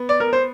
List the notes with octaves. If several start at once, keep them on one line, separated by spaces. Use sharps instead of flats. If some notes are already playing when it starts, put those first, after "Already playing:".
Already playing: B3
D5
A#4
C5